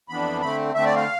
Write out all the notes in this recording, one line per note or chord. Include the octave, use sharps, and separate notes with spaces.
F2 E3 B3 D4 B5
D3 A3 C4 B5
D3 A3 C4 E5
D5
F5